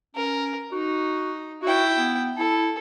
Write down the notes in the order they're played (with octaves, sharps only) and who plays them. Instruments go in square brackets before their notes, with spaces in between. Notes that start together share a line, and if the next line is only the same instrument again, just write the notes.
[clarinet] C#4 [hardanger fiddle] A#4
[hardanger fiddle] D#4 [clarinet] F#4
[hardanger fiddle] E4 G5 [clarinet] F#4
[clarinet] B3
[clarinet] E4 [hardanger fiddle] A4